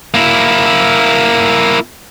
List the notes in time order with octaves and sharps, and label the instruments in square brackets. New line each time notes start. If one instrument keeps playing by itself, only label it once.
[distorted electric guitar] A#3 E4